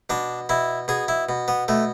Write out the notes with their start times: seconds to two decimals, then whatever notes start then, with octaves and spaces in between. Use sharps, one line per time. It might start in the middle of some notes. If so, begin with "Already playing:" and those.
0.10 B2 D4
0.49 B2 E4
0.88 B2 G#4
1.08 E4
1.29 B2
1.48 B3
1.68 B2 A3